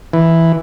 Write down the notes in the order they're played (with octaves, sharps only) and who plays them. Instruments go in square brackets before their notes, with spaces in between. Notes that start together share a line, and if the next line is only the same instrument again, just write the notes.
[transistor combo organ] E3